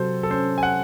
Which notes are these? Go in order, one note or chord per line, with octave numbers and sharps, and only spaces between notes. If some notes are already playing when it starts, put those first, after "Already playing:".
Already playing: C3 F#3 A4 C5
A4
C#4 C5
G#5
F#5